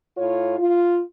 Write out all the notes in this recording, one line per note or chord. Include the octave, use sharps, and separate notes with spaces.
A2 F4 C#5
F4